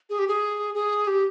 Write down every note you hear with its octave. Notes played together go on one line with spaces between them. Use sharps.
G#4
G4
G#4
G#4
G4